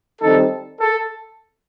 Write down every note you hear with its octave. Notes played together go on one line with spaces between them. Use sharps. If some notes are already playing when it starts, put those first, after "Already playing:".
D#3 G3 C4 D#4 A4
A4